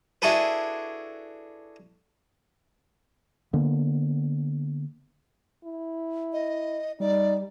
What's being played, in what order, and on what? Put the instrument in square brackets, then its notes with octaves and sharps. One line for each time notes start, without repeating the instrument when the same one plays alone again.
[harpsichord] D4 E4 F#4 G#4 A4 B4
[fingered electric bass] D3 A#3 B3
[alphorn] E4
[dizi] D#5
[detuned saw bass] G3 [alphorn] D#4 [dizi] D5